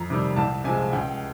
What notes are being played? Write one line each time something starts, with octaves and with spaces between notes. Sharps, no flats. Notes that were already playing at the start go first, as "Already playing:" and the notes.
Already playing: F2 A#5
C3 D#3 G3
C2 A5
C3 F3 G#3 G#5
C#2 G5